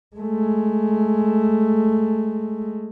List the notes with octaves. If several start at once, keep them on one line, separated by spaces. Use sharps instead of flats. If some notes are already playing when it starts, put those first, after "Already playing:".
G#3 A3